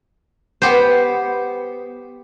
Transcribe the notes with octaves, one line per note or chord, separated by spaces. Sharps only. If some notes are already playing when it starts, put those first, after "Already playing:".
B3 G4 C5